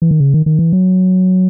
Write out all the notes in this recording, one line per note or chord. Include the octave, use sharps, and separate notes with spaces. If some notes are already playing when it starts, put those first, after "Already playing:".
E3
D#3
C#3
D#3
D#3
E3
F#3